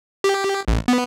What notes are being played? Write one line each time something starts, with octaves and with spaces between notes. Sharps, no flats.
G4
A1
B3